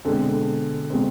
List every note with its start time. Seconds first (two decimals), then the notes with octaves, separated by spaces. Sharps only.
0.05 B2 D3 G#3 C4
0.90 B2 G#3 C4